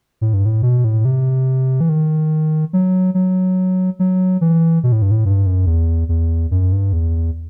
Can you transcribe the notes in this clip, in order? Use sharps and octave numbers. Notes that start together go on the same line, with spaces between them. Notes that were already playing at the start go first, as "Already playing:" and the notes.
A2
G2
A2
B2
A2
C3
E3
D#3
F#3
F#3
F#3
E3
B2
A2
G2
A2
G2
F#2
E2
E2
F#2
G2
E2